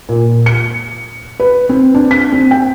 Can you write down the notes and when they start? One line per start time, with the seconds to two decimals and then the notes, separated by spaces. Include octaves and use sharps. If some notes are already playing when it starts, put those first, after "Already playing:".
0.09 A#2
0.46 C#7
1.40 B4
1.69 C4
1.94 D4
2.11 B6
2.32 C4
2.51 G5